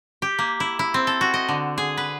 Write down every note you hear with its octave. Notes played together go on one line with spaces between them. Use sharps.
G4
A#3
E4
E4
C4
A4
F#4
D#5
D3
G#4
B4